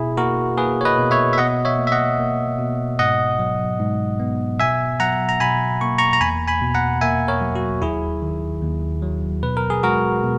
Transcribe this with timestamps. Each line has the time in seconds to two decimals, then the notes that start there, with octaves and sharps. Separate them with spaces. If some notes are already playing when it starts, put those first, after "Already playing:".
Already playing: B2 E4 G#4
0.17 A#3 F#4 A#4
0.57 A#3 G#4 B4
0.81 C#5
0.85 B4 D#5
0.98 B2
1.11 C#5 E5
1.33 E5
1.38 B2 D#5 F#5
1.65 C#5 E5
1.79 A#3
1.87 E5
1.92 D#5 F#5
2.19 A#3
2.59 B2
2.99 G#2 D#5 F#5
3.39 F#3
3.79 G#2
4.20 B3
4.60 B2 E5 G#5
5.00 F#3 F#5 A#5
5.29 A#5
5.40 B2 G#5 B5
5.81 A#3 C#6
5.98 A#5 C#6
6.13 A#5
6.21 E2 G#5 B5
6.48 G#5 B5
6.62 B2
6.74 F#5 A#5
7.01 A#3 E5 G#5
7.28 A#4 C#5
7.41 F#3
7.55 F#4
7.82 D#2 E4 G#4
8.22 D#3
8.62 D#2
9.03 F#3
9.43 B2 B4
9.57 A#4
9.70 G#4
9.83 G#3 F#4 A#4
10.23 B2